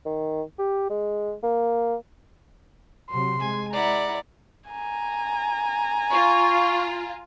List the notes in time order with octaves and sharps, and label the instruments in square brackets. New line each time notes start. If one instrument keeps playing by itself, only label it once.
[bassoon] D#3
G4
G#3
A#3
[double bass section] C3 F#3 [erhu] C6
[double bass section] G#3 [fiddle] G#5
[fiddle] E4 F#5 [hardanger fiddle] D5 [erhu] A#5
[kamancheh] G#5 A#5
[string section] F4 [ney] C#6